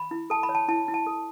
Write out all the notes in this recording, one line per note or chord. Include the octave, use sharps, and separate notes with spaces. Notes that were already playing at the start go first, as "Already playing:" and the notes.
Already playing: B5
E4
A4 A5
B5
C#5
A5
E4 A5
E4
A5
A4